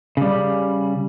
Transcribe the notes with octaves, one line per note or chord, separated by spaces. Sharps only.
C#3 G3